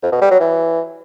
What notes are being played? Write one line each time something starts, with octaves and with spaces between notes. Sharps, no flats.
F2
B2
G3
F#3
E3